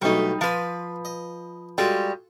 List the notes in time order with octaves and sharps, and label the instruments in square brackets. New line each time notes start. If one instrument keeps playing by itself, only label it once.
[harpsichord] B1 B2 A3 [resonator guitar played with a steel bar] G3 D#4
[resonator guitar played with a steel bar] F3 B4 [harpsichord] F5 B5 C6
[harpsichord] D#5
[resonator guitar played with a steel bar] G3 G#3 [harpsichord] F4 F#4 A4